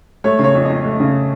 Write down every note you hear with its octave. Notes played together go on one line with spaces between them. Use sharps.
A3 C#5
C#3
C#5
F2
F2 D#5
A3
C#3